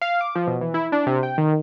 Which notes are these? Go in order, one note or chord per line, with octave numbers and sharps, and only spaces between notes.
F5
D6
F3
B2
E3
E4
D4
C3
G5
D#3